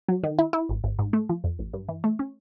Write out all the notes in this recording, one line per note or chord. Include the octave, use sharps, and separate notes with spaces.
F#3
D#3
E4
E4
G#1
G#1
G#2
A3
F3
F2
A1
G2
E3
A3
C#4